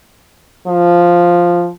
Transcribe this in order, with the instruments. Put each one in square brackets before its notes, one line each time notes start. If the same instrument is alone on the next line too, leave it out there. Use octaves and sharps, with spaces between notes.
[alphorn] F3